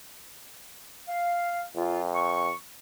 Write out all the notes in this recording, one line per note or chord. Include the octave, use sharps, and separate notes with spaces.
F5
F2 F4
C#6